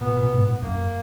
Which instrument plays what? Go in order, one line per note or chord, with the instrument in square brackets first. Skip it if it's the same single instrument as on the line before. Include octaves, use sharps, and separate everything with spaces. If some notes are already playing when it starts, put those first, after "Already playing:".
[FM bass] A#2 [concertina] B3
[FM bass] A#2
B2
G#2
A#2
[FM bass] F#2 [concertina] A#3